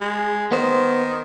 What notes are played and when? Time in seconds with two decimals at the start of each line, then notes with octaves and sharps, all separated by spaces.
0.01 G#3
0.52 D#3 B3 C5